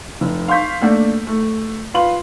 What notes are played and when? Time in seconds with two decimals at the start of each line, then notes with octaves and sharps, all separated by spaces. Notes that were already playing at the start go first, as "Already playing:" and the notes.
0.21 F1
0.48 F5 C6 C#6 G6 B6
0.81 A3 A#3 D4
1.27 A3
1.94 F4 B4 C6 F#7